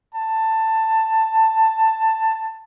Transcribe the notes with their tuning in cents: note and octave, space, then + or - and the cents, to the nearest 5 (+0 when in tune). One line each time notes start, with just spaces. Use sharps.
A5 +15